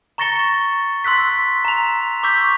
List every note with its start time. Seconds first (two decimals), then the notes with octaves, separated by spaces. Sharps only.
0.18 A#5 C#6 A6 A#6 C#7 G7
1.04 C6 E6 F#6 B6
1.65 A#5 F7
2.23 C#6 D6 E6 G6 B6